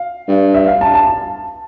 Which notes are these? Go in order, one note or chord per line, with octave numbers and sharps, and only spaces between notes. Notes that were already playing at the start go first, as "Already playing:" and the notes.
Already playing: F5
G2
E5
F5
A5
A5
A5